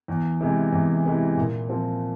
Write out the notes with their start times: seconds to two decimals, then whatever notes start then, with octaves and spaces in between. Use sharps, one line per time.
0.08 E2
0.41 C3 E3 G#3
0.72 E2
1.05 C3 E3 G#3
1.37 A#2
1.69 F3 C4